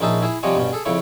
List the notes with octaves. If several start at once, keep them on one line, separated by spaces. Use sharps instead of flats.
A#1 C#4 D#4 G#4 E5 A5
E4 G#4 E5
C3 F3 G3 C#5 D#5 G#5
G2 B2 C#4
G#4 A4
F2 C#3 E4 C#5